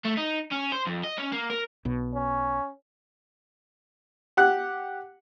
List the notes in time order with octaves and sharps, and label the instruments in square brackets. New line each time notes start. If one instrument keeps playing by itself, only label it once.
[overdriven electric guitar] A3
D#4
C#4
C5
F2
D#5
C#4
A#3
A#4
[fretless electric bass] B1 B2
[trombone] C#4
[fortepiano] G4 F#5 F#6